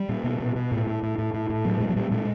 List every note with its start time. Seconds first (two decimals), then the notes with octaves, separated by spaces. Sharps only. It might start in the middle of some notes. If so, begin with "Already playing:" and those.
Already playing: G3
0.09 A#2
0.24 B2
0.40 B2
0.56 B2
0.72 A2
0.87 A2
1.03 A2
1.18 A2
1.34 A2
1.50 A2
1.65 A#2 F#3
1.80 A#2 G#3
1.89 F#3
1.96 A#2 G3
2.11 A#2 G#3